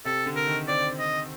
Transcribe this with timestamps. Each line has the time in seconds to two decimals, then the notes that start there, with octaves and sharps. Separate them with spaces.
0.05 C3 A4
0.26 D3
0.36 A#4
0.47 D#3
0.68 C4 D5
0.99 D#5